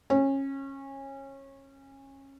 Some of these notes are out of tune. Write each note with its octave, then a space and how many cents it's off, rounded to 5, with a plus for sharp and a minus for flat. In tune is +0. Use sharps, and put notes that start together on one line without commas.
C#4 -25